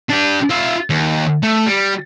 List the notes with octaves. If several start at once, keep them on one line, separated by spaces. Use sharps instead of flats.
D4 G4
F4 E5
D#2
A3
G3